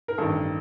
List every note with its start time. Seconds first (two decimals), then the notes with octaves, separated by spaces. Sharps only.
0.08 A#4
0.18 A1 G2 D#3 A4